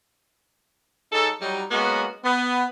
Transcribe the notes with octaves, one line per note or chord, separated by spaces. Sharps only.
F#3 D#4 G#4 A4
F#3 G3 D#4
F#3 G#3 A#3 B3 C#4 F#4
B3